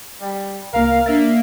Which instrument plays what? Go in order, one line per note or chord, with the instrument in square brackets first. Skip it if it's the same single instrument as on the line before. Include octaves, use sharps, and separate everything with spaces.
[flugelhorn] G3
[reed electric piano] C2 A#3 [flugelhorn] A#4 [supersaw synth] F5
[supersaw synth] A#3 [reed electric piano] D4 A6 [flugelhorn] E5